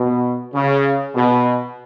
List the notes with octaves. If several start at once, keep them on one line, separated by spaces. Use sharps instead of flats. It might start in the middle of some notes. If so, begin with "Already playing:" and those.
Already playing: B2
C#3
B2